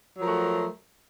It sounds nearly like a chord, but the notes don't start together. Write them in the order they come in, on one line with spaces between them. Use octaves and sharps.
F#3 F3 A#4 A3 F#4